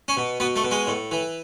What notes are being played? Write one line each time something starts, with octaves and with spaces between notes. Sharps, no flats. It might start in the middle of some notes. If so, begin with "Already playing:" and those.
C#4
B2
B2 B3
A3
B2
G#3
A2
E3